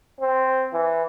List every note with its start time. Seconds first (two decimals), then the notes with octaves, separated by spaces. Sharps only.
0.21 C4
0.73 E3